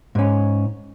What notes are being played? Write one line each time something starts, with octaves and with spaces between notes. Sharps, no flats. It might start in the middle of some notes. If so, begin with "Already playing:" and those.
G#2 C#4